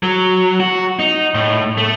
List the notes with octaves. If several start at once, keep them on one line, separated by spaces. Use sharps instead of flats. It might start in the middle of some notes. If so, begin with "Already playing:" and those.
F#3
F#4
D#4
A2
A3